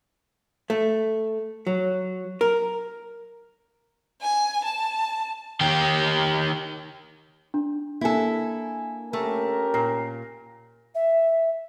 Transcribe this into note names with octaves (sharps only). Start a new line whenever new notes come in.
A3
F#3
A#4
G#5
A5
D#3 G4
D4
A#3 E4 A4 G#5
A3 C#4 G4 A#4
A#2 A#6 C7
E5